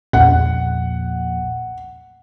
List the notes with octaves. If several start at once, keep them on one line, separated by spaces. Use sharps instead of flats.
A#1 E2 F#5